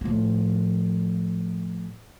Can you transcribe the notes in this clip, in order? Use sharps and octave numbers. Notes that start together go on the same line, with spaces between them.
A2 F3